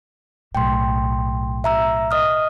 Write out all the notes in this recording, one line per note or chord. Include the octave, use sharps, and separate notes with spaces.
B1 A2 G5 C6
E5 A#5 E6
D#5 D#6 F6